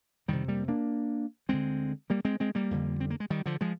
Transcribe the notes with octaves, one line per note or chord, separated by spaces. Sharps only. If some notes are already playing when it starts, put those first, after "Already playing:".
F2 C3 D#3 G3
G3 A#3
A#3 D4
D2 D3 G#3 C4
G3 A#3
G#3 C4
G#3 C4
G3 A#3
F2 D3
C4
A#3
G#3
D#3 G3
D3 F3
F3 G#3